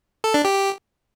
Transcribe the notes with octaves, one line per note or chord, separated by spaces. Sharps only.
A4
D4
G4
G4